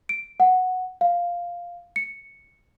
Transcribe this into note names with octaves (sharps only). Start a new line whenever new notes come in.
D7
F#5
F5
C#7